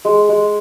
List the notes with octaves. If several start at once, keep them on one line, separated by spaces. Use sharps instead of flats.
G#3
G#3